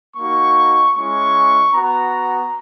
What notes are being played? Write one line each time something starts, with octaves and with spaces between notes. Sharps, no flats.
A#3 D#4 F#4 C#6
G#3 C#4 E4 C#6
B3 F#4 A#5